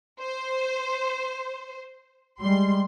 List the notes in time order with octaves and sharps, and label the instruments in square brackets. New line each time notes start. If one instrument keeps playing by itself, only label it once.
[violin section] C5
[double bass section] G3 G#3 [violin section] C6